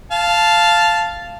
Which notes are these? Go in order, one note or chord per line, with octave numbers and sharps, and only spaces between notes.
F5 A5